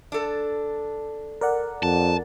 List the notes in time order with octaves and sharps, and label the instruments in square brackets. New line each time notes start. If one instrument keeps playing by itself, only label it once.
[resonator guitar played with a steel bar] D4 A4
[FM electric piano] A#4 D5 F#5
[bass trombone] F2 [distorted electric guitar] A5